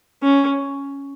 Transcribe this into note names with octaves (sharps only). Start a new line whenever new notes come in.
C#4